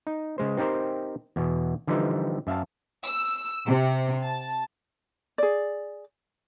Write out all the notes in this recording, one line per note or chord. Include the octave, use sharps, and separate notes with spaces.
D#4
C#3 G#3 C5
C4 D#4 G4 A#4 C5
E2 B2
D3 E3 F3 G3 D#4 G4
F#2 E5 F5 A5
E6
C3
A5
G#4 D5